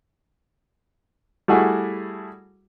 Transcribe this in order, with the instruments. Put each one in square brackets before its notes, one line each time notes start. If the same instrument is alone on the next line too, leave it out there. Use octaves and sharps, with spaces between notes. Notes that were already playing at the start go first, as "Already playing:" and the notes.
[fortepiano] G3 A3 E4 F#4 G#4